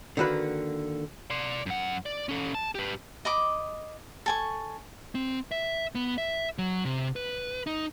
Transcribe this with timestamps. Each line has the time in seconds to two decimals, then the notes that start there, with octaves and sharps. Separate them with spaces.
0.17 D3 D#3 A#3 F#4 B4
1.30 D5 C6
1.66 F#2 F#5
2.06 D5
2.29 C#4 A4
2.55 A5
2.75 G4 B4
3.25 D#5 B5 D6
4.26 A4 G#5 C#6
5.15 C4
5.52 E5
5.95 B3
6.18 E5
6.58 F#3
6.85 C3
7.16 B4
7.67 D#4